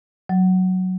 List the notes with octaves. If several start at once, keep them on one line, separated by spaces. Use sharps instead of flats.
F#3